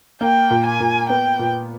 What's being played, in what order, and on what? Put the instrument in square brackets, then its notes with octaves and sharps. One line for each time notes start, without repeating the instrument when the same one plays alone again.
[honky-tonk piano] A#3 [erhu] G5
[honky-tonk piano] A#2
[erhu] G#5
[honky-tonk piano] A#2
[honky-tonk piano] B3 [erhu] G5
[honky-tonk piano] A#2